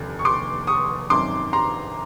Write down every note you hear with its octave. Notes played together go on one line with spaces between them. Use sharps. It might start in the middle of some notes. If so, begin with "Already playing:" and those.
Already playing: F1 D#2 D3
C#6
C6 D6
C#6 D#6
G#1 F#2 D#3 C6 D6
A#5 C6